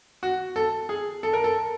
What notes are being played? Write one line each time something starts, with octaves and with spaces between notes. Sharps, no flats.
F#4
A4
G#4
A4
A#4
A4